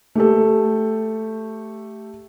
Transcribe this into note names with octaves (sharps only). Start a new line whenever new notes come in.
A3 G4 A4